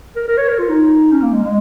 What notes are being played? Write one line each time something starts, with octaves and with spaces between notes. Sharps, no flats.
A#4
A#4
C#5
A#4
F4
D#4
C#4
A#3
G#3
G#3